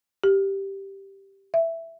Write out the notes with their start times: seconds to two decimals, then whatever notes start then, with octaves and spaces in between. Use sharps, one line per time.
0.24 G4
1.54 E5